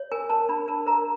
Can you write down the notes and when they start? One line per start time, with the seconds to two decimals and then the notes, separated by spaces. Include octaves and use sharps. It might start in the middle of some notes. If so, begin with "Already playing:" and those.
Already playing: C#5
0.12 A#4 G#5
0.30 A#4 A5
0.49 D4 B5
0.68 A#4 A5
0.87 A#4 A#5